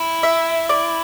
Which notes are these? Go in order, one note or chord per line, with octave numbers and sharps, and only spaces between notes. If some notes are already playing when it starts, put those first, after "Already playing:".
Already playing: E4
E5
D5